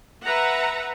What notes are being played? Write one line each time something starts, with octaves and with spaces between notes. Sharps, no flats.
B4 E5 F#5 A#5